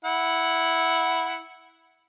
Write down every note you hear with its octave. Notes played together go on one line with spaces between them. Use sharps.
E4 F#5